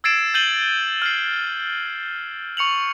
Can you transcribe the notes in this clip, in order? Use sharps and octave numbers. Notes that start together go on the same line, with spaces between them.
E6 G#6 A6 C7 D7 E7
G6 A6 C7 D#7 F#7 G7
F6 C7
C#6 C#7 F7 F#7